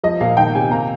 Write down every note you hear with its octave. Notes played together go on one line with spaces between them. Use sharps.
F3 D#5
A#2 F5
D#3 G5
C3 G#5
A#3 A#5